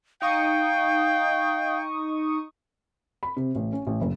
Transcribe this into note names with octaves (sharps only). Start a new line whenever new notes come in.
D#4 F5 G5 C#6 D#6
B5
C3
A1
C#4
A1
F#1